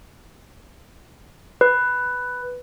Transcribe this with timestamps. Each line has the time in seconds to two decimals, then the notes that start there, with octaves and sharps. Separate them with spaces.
1.61 B4